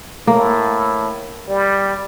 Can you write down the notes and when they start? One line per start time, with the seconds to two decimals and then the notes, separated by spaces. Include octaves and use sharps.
0.27 A2 A#3
1.49 G3